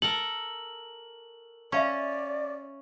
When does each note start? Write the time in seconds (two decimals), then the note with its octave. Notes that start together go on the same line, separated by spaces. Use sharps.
0.02 A4 A#4 F#7
1.72 C#4 D5 E5 F5 C#6